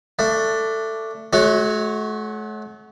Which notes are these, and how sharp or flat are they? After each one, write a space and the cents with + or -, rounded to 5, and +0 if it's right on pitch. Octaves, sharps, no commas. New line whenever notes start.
A3 +15 D4 +0
A3 -40 F#4 +0 C#5 +0